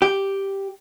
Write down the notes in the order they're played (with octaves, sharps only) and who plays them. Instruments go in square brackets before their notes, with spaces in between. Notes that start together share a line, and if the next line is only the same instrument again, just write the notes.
[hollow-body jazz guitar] G4